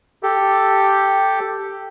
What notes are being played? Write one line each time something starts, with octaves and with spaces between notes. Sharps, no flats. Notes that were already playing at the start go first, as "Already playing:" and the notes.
G4 A4